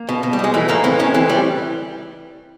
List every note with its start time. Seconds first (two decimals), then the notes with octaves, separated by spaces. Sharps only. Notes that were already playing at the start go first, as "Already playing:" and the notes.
Already playing: A#3
0.09 B2
0.23 B2
0.33 G3
0.39 B2 G#3
0.54 E3 A3
0.68 A2 A#3
0.84 E3 C4
1.00 A2 C#4
1.14 E3 C4
1.29 G3